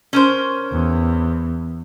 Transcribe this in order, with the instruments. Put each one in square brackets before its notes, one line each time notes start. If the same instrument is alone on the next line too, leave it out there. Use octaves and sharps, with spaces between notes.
[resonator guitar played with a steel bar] C#4 A#4 C5
[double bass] E2